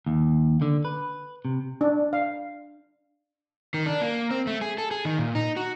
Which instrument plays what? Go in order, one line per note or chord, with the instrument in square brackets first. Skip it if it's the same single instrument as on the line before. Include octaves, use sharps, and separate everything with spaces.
[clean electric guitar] D#2
D3
B4
C3
[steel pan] D4
F5
[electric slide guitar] D#3
D4
A#3
C4
A3
G#4
A4
G#4
D#3
A#2
D#4
F#4